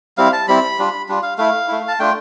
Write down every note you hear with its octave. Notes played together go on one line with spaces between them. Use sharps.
G3 C4 E4 F5
A5
G3 C4 E4 B5
G3 D4 F4
G3 D4 F4
F5
A3 E4 F5
A3 E4
A5
A3 D4 F4 G5